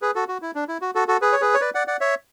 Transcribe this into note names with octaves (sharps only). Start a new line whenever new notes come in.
G#4 B4
F#4 A4
F#4
E4
D4
E4
F#4
F#4 A4
F#4 A4
G#4 B4
C#5
G#4 B4
C#5
B4 D5
D5 F#5
D5 F#5
C#5 E5